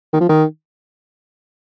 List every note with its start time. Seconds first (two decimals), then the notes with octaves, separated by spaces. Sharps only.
0.13 D#3
0.21 F3
0.29 D#3